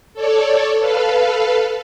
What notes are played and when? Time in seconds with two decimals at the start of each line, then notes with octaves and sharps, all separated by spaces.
0.14 A4 C#5 D5
0.78 A4 B4 F5